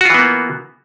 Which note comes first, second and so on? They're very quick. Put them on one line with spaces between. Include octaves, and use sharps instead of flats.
F#4 F4 E3 B3 A#3